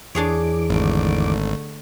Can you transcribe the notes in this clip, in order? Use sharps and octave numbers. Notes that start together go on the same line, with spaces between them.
E2 E3 D4 G#4 C#5 D6
G#1 D3 A3